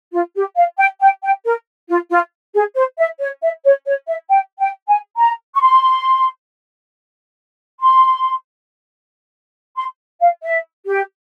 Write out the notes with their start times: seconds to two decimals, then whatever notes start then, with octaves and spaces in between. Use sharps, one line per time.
0.13 F4
0.36 G4
0.56 F5
0.78 G5
1.01 G5
1.23 G5
1.45 A#4
1.89 F4
2.11 F4
2.54 G#4
2.75 C5
2.99 E5
3.20 C#5
3.42 E5
3.64 C#5
3.86 C#5
4.07 E5
4.29 G5
4.59 G5
4.88 G#5
5.17 A#5
5.55 C#6
5.61 C6
7.80 C6
9.77 C6
10.20 F5
10.43 E5
10.86 G4